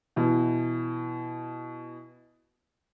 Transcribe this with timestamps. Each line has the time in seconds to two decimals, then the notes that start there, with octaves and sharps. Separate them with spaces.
0.16 B2 E3